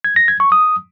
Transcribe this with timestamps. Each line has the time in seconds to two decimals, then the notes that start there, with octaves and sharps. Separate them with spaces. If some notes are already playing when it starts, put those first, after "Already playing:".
0.04 G#6
0.16 A#6
0.28 G#6
0.40 C#6
0.52 D#6